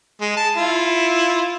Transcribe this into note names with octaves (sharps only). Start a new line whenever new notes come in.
G#3
A5
E4 F4